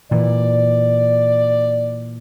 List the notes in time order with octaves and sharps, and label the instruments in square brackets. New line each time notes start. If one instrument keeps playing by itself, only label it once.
[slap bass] A#2 E3 [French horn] D5